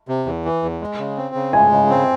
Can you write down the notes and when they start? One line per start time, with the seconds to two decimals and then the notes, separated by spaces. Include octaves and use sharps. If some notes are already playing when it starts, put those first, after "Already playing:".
0.08 C3
0.26 E2
0.45 E3
0.62 E2
0.81 G#3
0.99 C#3
1.17 C4
1.35 C#3
1.53 G#3 G#5
1.71 C#3
1.90 C4